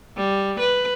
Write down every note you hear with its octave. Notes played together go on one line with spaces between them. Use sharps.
G3
B4